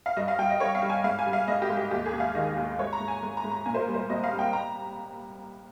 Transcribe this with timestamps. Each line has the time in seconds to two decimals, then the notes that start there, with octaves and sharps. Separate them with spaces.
0.06 F5
0.17 G2 D#5
0.28 F5
0.38 G2 G5
0.50 D#5
0.60 G3 C#5
0.75 F5
0.82 G3
0.90 G#5
1.04 G#2 F5
1.19 G#5
1.26 G3
1.33 F5
1.48 G#2 D#5
1.62 G4
1.69 G#2
1.77 G4
1.91 D#2 G4
2.06 G#4
2.13 D#2
2.20 F5
2.35 D#3 D#5
2.57 D#2
2.79 G#2 C#5
2.93 A#5
3.00 G#2
3.08 G#5
3.23 G#2
3.37 A#5
3.44 G#2
3.51 A#5
3.66 A#2 G#5
3.74 C5
3.80 A#4
3.87 G3
3.94 C5
4.09 C2 D#5
4.24 F5
4.32 G3
4.39 G5
4.53 A#5